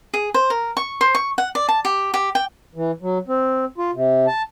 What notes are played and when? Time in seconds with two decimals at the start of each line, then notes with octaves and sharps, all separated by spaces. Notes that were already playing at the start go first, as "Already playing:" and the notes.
0.14 G#4
0.34 C5
0.50 A#4
0.77 C#6
1.01 C5
1.15 C#6
1.38 F#5
1.55 D5
1.69 A5
1.85 G4
2.14 G4
2.35 G5
2.75 E3
3.02 F#3
3.28 C4
3.78 F4
3.94 C3
4.27 A5